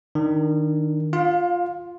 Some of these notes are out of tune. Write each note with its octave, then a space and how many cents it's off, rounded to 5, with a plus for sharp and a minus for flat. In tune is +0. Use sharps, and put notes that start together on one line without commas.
D#3 +0 D4 +15
F4 +0 F5 +30